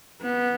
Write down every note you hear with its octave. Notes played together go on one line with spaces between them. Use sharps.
B3